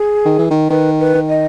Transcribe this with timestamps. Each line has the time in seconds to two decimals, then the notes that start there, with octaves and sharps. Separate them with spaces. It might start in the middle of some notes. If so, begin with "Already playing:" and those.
Already playing: G#4
0.25 D#3
0.39 E3
0.51 D#3
0.70 D#3 B4
1.00 B4
1.15 D#3
1.29 D#5